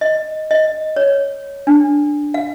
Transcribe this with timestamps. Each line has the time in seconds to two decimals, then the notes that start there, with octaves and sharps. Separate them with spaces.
0.01 D#5
0.51 D#5
0.96 C#5
1.67 D4
2.34 F5